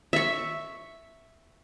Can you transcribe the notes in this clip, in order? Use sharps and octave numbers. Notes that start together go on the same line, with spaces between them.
E5 C#6